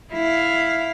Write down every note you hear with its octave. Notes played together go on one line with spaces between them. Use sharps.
E4 F5